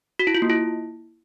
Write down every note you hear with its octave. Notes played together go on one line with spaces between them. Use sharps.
F#4
E4
F4
A#3
E4